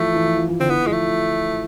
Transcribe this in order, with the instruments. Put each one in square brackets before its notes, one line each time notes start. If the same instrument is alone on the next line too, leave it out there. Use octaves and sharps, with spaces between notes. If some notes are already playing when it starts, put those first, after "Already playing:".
Already playing: [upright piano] E3 F3 [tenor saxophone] A3
[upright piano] E3
F3
F3
E3
[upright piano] D3 [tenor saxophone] C4
[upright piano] E3 [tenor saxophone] B3
[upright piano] F3 [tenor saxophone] G#3
[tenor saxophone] A3